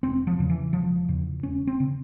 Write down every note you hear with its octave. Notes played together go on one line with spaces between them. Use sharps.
E1 C4
F3
E2 C#3
E3
E1 F3
E2 C#3
E1 C#4
C4
C#3